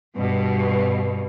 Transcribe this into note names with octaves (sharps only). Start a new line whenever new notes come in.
G2 B2